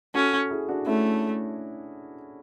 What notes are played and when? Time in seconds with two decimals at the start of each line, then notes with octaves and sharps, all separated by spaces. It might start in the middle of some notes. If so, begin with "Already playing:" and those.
0.15 C#4 F#4 A4
0.33 F#4 A4
0.51 E4 G#4
0.69 D4 F#4
0.86 A3 C#4 E4